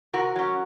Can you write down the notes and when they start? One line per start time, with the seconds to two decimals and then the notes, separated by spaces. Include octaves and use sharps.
0.13 C3 F#4 A#4
0.36 F#3 C#4